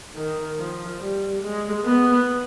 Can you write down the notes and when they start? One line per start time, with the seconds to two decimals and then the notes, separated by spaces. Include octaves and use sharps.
0.15 D#3
0.58 F3
1.01 G3
1.42 G#3
1.85 B3